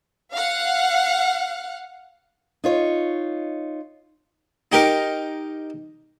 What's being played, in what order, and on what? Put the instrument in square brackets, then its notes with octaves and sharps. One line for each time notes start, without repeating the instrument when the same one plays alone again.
[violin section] F5 F#5
[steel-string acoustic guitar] D#4 F4 C#5
[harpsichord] D#4 G4 A#4